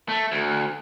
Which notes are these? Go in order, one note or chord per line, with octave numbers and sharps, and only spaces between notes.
A3
D2